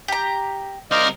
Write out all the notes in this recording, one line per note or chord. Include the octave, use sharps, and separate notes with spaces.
G4 A#5
C2 A#4 C5 D5 D#5 F5